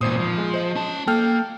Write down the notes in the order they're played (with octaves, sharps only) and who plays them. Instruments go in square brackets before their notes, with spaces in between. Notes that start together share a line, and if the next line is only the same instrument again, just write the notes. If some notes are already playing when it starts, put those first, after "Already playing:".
[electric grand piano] G#1 C5 D#6 [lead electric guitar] E2 A#2
[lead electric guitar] F3
[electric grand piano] G#3
C5 D#5
[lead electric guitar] C#4 A5
[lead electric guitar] A#3 [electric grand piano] A4 G5 F6